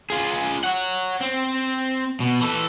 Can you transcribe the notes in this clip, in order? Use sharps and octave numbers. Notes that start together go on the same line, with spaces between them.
F4 G#4
C#5 F#5
C4
B2
E3 A4